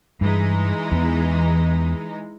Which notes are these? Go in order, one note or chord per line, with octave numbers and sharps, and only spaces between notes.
G2 E3 G#3 D#4
E2 B3